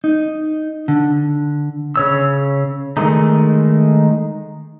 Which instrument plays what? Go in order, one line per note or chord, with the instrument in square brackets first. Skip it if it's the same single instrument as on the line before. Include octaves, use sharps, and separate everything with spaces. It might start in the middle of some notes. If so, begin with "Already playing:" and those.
[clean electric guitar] D#4
D3
[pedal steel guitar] C#3 C#5 E6
D#3 G#3 A3 D#4